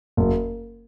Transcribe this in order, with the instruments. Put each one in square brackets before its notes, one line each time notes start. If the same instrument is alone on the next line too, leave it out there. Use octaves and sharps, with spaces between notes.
[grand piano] F#1